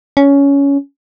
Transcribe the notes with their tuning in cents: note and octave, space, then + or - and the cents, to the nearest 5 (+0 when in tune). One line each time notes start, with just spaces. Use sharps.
C#4 +15